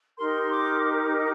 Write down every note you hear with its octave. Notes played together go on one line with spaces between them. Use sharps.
D#4 G4 A#4 C6
D6